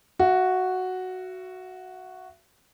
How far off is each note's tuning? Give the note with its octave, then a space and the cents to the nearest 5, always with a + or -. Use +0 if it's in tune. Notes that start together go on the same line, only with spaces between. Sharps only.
F#4 +0 E5 +40